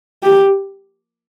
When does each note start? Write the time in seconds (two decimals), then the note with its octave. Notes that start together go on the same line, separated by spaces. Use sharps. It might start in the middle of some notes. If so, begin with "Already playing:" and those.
0.23 G4